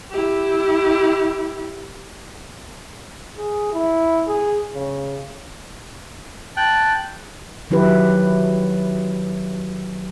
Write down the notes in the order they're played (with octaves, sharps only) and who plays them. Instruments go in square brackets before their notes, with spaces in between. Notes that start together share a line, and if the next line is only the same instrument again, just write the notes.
[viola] E4 G4
[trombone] G#4
E4
G#4
C#3
[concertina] G5 F#6 [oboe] A5
[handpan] D#3 F#3 E4 G4 B4